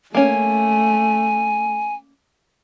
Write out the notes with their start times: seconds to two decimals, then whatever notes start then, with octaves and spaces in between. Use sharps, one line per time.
0.15 A3 A#3 C#4 G#5